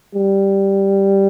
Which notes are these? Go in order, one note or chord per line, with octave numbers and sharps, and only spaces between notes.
G3